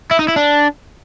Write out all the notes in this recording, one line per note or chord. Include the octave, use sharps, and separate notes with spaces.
E4
D#4
E4
D4